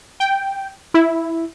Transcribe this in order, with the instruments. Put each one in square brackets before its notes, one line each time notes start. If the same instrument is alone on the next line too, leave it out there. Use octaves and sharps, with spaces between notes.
[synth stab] G5
E4